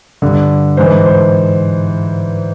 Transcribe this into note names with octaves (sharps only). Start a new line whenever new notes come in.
G2 D3
G#2 E3 C5
C5